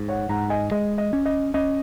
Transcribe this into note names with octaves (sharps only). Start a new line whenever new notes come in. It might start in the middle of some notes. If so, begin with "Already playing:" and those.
Already playing: G#2
C#5 F#5
G#2 F#5 A#5
D#5 G#5
G#3 D#5
D#5
C#4
D#5
C#4 D#5